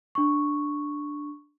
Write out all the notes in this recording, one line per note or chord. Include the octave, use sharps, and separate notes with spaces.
D4 C#6